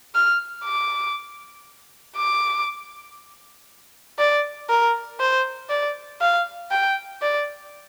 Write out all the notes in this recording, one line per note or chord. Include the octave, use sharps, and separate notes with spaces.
F6
D6
D6
D5
A#4
C5
D5
F5
G5
D5